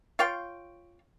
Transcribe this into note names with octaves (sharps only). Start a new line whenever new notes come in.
F4 C#5 F5 G5